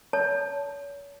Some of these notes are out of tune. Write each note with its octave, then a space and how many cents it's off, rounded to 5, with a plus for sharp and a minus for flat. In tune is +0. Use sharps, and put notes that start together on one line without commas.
C#5 +35 A5 +0